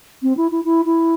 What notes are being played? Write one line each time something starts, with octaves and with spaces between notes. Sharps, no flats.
C4
E4
E4
E4
E4